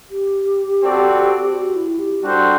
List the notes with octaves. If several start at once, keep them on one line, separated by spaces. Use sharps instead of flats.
G4
C4 F#4 A4 D5
F#4
E4
G4
G3 D4 F#4 A4 C5